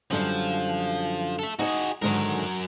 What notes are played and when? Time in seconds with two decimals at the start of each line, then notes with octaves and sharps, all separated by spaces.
0.11 F#2 D3 F3 G3
1.39 A4 E5
1.59 D#4 F#4 G#4 D#5
2.02 G#2 D3 D#3 F#3 A#4